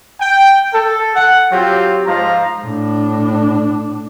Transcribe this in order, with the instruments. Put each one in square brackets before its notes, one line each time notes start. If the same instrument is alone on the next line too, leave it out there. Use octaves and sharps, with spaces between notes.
[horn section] G5
A4
F#5
F#3 C4 F4 G4
G#2 F3 F4 F5 A#5
[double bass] A2 D4